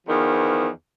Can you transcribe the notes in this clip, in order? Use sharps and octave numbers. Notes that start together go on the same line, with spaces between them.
E2 D#3 F3